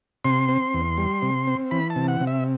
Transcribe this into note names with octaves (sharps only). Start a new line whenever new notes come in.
C3 C6
C4
E2
G3
C3
C4
E3 B5
A5
C3
F#5
C3
E5